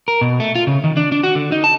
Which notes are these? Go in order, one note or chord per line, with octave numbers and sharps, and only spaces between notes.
A#4
B2
A3
F4
C#3
D#3
D4
D4
F#4
D3
D#4
A5